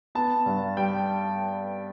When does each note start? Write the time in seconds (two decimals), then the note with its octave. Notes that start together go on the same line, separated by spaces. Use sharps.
0.15 B3 A5
0.46 G2
0.77 G3 G5